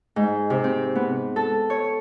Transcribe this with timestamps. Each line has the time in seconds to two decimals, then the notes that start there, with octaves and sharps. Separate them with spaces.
0.16 G#2
0.50 C3
0.64 C4
0.95 B3
1.36 A4
1.70 C#5